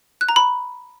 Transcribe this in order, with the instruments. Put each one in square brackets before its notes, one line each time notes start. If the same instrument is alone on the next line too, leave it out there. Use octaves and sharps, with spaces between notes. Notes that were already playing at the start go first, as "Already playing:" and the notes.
[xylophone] F#6
A#5
B5